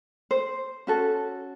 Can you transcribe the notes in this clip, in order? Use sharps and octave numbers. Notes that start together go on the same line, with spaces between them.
C5
C#4 F#4 A4